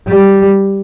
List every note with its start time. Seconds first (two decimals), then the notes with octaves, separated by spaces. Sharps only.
0.09 G3